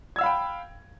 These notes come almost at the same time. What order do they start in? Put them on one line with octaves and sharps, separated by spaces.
G#6 E6 F5 B5 G5